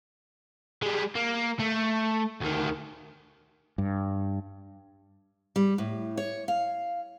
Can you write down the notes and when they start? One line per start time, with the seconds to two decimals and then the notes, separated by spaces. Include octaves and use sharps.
0.82 G3 G#3
1.15 A#3
1.59 A3
2.41 D2 D#3
3.78 G2
5.56 G3
5.78 A2
6.17 C#5
6.48 F5